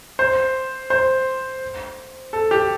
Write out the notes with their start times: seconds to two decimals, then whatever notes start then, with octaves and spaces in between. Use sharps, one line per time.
0.19 C5
0.90 C5
2.33 A4
2.51 G4